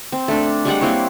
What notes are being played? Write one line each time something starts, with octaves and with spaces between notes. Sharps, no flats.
C4
A3 D4
G3 G#3 G4 F#5
A#3 C4 E4 C#5